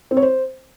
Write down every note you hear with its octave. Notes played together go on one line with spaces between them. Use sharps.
C4
C#5
C5